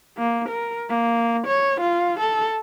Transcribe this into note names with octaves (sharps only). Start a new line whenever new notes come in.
A#3
A#4
A#3
C#5
F4
A4